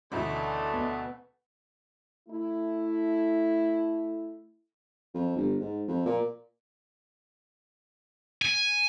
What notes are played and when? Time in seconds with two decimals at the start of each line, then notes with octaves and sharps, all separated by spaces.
0.12 D2 B2 D3 E3 A3 C#4
0.74 B3
2.29 A3 E4
5.14 F2
5.36 G1
5.60 G#2
5.88 F2
6.06 A#2
8.42 G#5